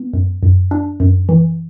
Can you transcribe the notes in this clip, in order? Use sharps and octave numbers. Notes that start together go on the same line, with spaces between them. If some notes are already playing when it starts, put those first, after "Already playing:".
Already playing: B3
F#2
F#2
D4
F#2
E3